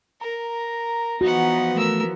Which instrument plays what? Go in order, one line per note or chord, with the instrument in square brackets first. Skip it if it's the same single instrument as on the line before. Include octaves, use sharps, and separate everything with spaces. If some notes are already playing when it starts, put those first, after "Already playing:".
[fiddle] A#4 [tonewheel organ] A#5
[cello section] E3 F3 B3 [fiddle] D#4 F#5 [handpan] F#4
[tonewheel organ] A3 [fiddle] A#4 E6